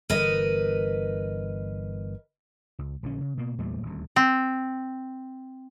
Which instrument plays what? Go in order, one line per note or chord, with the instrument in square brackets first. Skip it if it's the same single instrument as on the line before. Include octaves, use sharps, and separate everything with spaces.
[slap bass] G1 E3 [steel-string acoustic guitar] A#4 B4 D#5
[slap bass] C#2
A#1 D3 C#4
C#3
B2 A#3
E2 A#2 G3 A3
D#1 D2
[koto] C4